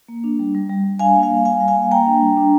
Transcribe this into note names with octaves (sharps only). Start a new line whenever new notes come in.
A#3
D4
G3
G3
G3
G3
D4 F5 G#5
A#3
F5 G#5
G3
G3 F5 G#5
G3
F5 G#5
A#3
A#3 G5 A#5
D4
G3
D4